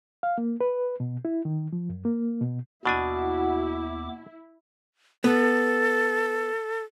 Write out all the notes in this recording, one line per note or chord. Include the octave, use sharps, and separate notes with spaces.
F5
A#3
B4
B2
E4
D#3
F3
F#2
A#3
B2
D#2 B2 B3 D4 E4 F#4 G#5 D6
B3 A4